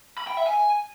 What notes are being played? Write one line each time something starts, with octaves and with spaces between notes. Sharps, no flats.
B5
G5
E5
G#5